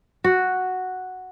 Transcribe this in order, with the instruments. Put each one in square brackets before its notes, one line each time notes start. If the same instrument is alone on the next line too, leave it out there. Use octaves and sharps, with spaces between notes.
[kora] F#4